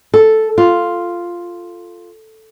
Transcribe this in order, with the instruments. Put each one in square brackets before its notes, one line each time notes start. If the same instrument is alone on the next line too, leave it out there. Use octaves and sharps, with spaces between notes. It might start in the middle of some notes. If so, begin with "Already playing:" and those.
[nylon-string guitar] A4
F4